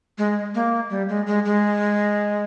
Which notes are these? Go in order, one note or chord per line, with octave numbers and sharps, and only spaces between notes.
G#3
A#3
G3
G#3
G#3
G#3